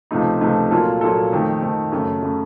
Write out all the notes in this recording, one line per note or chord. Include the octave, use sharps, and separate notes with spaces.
C#2 C3 F3 A3 D#4
C#2 C3 F3 A3 D#4
A#2 F#3 A#3 F4 A4
A#2 F#3 A#3 F4 A4
F2 D#3 A3
F2 D#3 A3
F#2 C#3 A3
C#3 A3